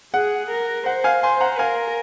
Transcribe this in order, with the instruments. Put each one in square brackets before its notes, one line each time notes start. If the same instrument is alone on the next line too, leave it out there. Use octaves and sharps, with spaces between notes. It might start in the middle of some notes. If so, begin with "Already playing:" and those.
[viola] G#4 [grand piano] F#5
[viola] A#4
[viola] C5 [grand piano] F#5
[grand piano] F5 G#5
[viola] C5 [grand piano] G#5 C6
[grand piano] F#5 A#5
[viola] A#4 [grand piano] F5 G#5